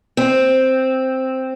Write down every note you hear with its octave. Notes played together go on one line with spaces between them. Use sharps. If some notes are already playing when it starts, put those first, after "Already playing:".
C4